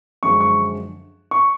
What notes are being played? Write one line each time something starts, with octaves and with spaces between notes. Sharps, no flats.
F#2 D3 F3 G#3 C#6
C#6
C#6